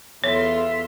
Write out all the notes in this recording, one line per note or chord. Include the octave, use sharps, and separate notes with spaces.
E2 F4 A4 C#5 E5 C6